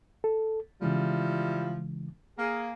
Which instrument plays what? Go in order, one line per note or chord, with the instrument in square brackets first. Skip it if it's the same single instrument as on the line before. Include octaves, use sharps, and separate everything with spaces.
[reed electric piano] A4
[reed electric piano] C#3 E3 G#3 [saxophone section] F3 G3 E4
[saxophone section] A#3 G#4